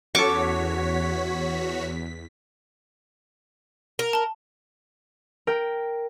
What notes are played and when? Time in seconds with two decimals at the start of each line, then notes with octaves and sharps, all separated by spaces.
0.15 E2 C#4 F#4 A4 C#5 C#6 D6 B6
3.99 A#4
4.13 A5 G7
5.47 A#4 G5